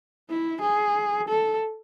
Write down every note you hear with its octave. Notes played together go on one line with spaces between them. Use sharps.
E4
G#4
A4